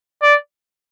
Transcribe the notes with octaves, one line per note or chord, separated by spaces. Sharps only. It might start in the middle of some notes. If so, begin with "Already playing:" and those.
D5